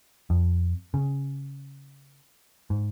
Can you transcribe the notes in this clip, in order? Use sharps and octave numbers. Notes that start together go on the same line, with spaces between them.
F2
C#3
G#2